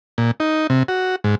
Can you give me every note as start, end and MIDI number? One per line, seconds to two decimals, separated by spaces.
0.18 0.31 46
0.40 0.67 63
0.70 0.83 48
0.88 1.16 66
1.24 1.35 44